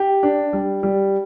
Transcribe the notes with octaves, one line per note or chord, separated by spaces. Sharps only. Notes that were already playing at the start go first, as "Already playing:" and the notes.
Already playing: G4
D4
G3
G3